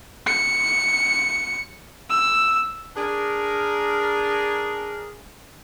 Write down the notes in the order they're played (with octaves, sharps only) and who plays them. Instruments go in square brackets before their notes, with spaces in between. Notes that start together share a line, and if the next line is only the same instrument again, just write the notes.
[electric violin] C#7
E6
[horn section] D4 G#4 A#4